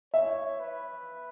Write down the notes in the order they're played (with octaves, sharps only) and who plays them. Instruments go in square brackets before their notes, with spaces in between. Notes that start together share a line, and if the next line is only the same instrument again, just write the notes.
[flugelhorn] C#5 [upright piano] E5
[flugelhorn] B4